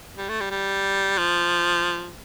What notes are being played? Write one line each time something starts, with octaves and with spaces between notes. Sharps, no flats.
G3
A3
G3
G3
F3